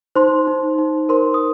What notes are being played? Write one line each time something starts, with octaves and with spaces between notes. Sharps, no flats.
D#4 C5 C6
D#4
D#4
A#4 C5 C6
D#6